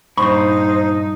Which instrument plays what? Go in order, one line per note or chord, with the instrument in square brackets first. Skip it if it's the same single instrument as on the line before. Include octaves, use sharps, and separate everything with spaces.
[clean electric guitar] G2 A#2 [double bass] D#4 [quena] C5 [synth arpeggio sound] B5 C#6